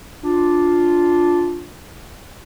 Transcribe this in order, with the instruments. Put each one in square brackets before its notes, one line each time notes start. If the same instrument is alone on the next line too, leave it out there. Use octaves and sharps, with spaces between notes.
[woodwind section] D4 F4